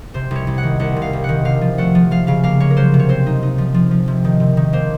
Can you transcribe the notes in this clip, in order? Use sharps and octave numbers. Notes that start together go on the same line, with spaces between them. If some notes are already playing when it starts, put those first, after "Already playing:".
C3 C5
C2 C#5
C2
F#5
D#3
C2 F#5
C3
F5
C2
D#3 F#5
C3 F5
F3
A3 F#5
F3
F3 F5
C#3 F5
A#3 F5
A#3 C#5
A#4
F#3 C5
C3
C#5
C4 C5
D#4
D#4
F3
F3
F3
C3
D#3
C3
D#3
A#3 C5